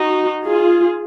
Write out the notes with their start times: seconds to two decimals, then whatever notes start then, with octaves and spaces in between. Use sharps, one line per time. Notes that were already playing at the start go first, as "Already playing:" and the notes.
Already playing: D#4 F#4
0.44 F4 G#4